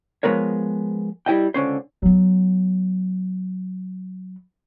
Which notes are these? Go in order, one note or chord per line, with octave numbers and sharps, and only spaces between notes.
F3 G#3 B3 A#4 C#5
G3 E4 D#5 G5
C#2 D3 C#4 C5
F#3 B3